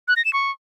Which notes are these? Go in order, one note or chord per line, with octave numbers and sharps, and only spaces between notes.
F#6
A#6
E7
C#6